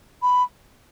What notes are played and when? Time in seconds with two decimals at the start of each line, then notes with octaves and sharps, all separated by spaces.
0.22 B5